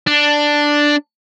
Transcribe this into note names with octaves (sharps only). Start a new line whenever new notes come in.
D4